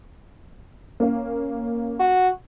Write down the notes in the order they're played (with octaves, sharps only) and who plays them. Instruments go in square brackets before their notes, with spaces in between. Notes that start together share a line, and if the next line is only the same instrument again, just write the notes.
[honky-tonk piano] A#3 C#4 F5
[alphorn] F#4